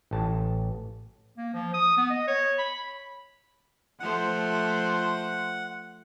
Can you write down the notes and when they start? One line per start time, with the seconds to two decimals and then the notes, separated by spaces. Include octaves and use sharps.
0.11 A1 A5
1.37 A#3
1.54 F3
1.74 D#6
1.97 B3
2.10 D#5
2.27 C#5
2.58 B5
4.00 F3 A3 C5 F#5